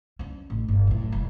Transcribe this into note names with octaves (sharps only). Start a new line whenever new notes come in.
C#4 D4
A1
G1
F#2 A2
E1